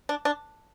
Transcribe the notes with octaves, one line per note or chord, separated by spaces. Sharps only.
D4
D4